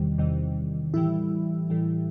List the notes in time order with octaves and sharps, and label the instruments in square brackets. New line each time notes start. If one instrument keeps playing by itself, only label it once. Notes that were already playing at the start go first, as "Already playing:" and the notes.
Already playing: [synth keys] E2 C3 D#3 G3
E2 C3 D#3 G3
A2 E3 G3 E4
A2 E3 G3